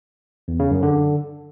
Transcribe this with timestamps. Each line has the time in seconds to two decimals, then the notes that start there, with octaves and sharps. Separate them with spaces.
0.48 E2
0.60 C#3
0.71 F#2
0.83 D3